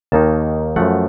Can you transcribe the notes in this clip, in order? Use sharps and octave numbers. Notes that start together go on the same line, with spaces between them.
D#2 D#3 A#3 D#4 A5
F#2 F3 A3 F#5